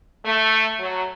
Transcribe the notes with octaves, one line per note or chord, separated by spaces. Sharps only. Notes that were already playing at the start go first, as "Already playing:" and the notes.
A3
F#3